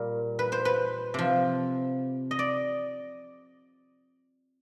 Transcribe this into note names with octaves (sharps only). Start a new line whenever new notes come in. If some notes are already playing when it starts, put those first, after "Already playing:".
Already playing: A#2 G3 A#4
B4
C5
B4
C3 F3
D#5
D5